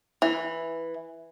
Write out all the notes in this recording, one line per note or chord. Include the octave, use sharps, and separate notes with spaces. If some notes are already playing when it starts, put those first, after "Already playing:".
E3